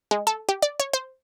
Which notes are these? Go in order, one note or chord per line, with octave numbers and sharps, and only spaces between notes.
G#3
A4
G4
D5
C#5
C5